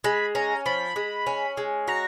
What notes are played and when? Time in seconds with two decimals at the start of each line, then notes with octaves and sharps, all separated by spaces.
0.04 G#3 B5
0.35 C#4 A#5
0.66 F3 B5
0.96 G#3
1.27 C#4
1.57 G#3
1.88 F#4 A#5